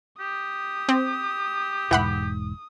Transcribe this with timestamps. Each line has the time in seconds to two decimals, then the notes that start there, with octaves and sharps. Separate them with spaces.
0.20 G4 D#6
0.89 C4
1.91 E1 G#2 E3 F#5 B5